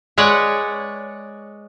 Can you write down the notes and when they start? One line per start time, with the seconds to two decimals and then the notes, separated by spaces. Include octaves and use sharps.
0.18 G#3 B4 C#5 D5 F#5